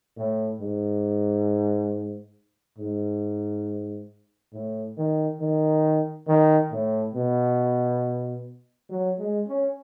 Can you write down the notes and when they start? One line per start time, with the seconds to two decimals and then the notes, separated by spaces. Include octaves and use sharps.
0.17 A2
0.60 G#2
2.78 G#2
4.53 A2
4.97 D#3
5.40 D#3
6.27 D#3
6.71 A2
7.15 B2
8.89 F#3
9.19 G#3
9.48 C#4